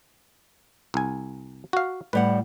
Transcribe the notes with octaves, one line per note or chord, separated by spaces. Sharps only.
C2 G#5
F#4 F5
A2 G3 B4 F#5